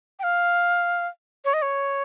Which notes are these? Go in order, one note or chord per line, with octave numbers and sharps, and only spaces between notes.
G5
F5
C#5
D#5
C#5